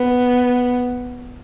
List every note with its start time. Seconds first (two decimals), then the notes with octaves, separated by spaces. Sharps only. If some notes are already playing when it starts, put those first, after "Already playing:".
Already playing: B3